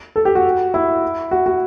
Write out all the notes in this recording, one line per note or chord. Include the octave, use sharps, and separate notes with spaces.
A4
G4
F#4
E4
F#4
F#4